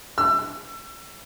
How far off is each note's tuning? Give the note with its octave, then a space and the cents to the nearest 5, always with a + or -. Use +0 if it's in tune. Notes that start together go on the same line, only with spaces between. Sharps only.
E6 +30